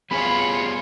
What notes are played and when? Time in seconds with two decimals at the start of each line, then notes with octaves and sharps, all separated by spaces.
0.11 G3 B3 F4 G#4 C#5 B5